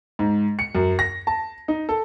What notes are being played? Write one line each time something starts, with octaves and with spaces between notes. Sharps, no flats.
G#2
C#7
F#2
A#6
A5
D#4
A4